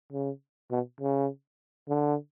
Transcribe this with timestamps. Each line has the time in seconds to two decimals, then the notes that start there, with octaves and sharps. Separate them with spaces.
0.13 C#3
0.71 B2
1.01 C#3
1.88 D3